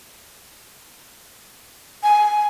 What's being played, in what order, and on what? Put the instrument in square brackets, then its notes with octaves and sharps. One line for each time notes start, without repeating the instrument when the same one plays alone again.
[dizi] G#5